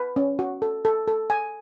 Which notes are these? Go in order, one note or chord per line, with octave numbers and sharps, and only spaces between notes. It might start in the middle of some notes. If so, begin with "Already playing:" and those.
Already playing: B4
C#4
F#4
A4
A4
A4
G#5